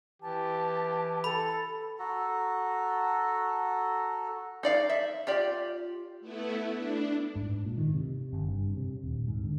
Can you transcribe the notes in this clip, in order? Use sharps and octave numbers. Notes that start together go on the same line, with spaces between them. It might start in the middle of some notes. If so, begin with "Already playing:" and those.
E3 G4 A5
A4 B5
F#4 A4 A#5
D#4 D5 F5
E5
F4 G4 D5
A3 B3 E4
D4
G#2
A#2
D#3
C3
G1
G2
C3
D#1
G#2
D3